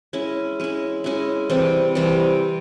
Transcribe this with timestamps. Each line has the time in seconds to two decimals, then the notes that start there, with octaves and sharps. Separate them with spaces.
0.13 G#3 C#4 E4
0.60 G#3 C#4 E4
1.04 G#3 C#4 E4
1.50 C3 E3 G3 C4
1.95 C3 E3 G3 C4